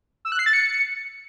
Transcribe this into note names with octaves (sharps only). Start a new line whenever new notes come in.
E6
F#6
C7
A6
C#7